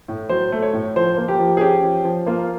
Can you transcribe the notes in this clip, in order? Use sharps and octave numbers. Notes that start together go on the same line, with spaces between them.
A2
F#3 C5
A3
C#5
A2
F3 C5
A#3
G4
F3
G#4
C#4 G4
F3
F3
A#3 F4